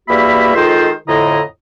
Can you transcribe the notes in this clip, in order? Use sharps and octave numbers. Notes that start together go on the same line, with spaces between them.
E2 G3 A#3 F#4 E5 B5
D#3 G#3 F4 A4 C5
F2 A2 D3 E4 D#5 A#5